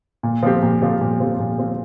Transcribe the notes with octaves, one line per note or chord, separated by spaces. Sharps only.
A#2
F3 C4 G4
A#2
F3 C4 G4
A#2
F3 C4 G4
A#2
F3 C4 G4